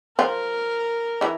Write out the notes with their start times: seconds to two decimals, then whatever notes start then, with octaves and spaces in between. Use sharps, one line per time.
0.18 F3 F4 A#4
1.21 E3 E4